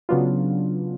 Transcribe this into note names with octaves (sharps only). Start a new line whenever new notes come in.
C#3 F#3 B3 D4 F4